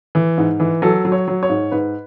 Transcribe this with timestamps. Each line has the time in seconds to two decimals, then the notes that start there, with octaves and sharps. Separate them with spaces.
0.15 E3
0.38 G#2
0.60 E3
0.82 F#3 A4
1.05 F#3
1.12 C#5
1.28 F#3
1.43 C#5
1.49 G#2
1.72 G#2 B4